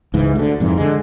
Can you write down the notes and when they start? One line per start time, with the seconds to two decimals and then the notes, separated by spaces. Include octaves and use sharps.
0.14 C#2 G#2 E3
0.35 D2 D3
0.60 F2 G#2 C3 E3
0.77 D3 G#3